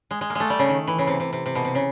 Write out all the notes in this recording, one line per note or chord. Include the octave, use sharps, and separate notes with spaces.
G#3
G#3
A#3
G#3 A3
G3
C#3
D#3
E3
C#3
C3
C3
C3
C3
B2
C3
C#3